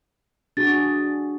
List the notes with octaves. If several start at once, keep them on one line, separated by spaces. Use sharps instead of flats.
D4 F#4 G#4 A6